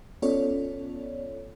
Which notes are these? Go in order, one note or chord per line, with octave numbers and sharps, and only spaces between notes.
B3 C#4 F4 A4 C#5 D5